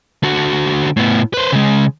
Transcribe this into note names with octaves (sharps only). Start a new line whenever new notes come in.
D3 F#4
A2 B3
B4 C5
C#3 G#3